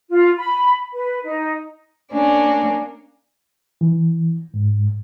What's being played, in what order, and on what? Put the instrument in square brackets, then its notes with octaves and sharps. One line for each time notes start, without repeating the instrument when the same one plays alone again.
[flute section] F4
B5
B4
D#4
[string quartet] A#3 C#4 D4
[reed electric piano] E3
G#2